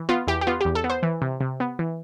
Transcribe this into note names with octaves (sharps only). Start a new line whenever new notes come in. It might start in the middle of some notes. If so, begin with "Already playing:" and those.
Already playing: E3
B3 F4
E2 G4
G4
B3 F4
E2 G4
A4
B3
C5
E3
C3
C3
B3
E3